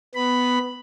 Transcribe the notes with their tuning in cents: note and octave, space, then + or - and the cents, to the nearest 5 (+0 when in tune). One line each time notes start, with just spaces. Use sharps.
B3 +10 B5 +5